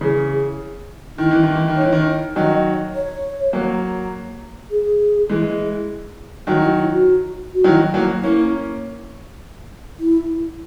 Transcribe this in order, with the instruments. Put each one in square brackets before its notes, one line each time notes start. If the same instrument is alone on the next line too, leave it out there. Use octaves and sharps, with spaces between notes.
[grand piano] C#3 E3 [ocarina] G#4
[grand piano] D#3 [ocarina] E4
[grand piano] E3
D#3
E3
D#3
[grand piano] E3 [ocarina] C#5
[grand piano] D#3
[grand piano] D#3 F#3 [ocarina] D#5
[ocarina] C#5
[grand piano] F#3 A#3
[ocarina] G#4
[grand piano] E3 G#3
[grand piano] D#3 F#3 [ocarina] F#4
[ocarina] E4
E4
F#4
F#4
[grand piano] D#3 F#3 [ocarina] E4
[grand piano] F#3 A#3
[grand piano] A#3 C#4 [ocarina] E4
[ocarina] E4